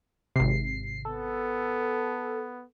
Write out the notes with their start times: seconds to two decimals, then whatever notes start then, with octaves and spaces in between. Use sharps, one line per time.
0.36 G#1 C3 C7
1.05 B3 A4